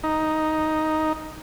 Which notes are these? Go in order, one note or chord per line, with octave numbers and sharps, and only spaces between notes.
D#4